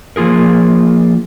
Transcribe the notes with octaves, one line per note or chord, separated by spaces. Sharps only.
F3 A#3 F4 G#4 A#4